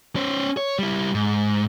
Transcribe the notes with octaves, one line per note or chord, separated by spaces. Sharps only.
C#4 C5
C#5
G3 E4
G#2